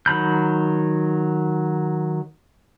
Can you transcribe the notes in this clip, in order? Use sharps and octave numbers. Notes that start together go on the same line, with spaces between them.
D#3 F#3 B5 G6